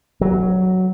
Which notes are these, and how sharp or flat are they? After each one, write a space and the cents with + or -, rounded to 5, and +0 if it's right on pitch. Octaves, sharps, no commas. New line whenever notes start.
F#3 +5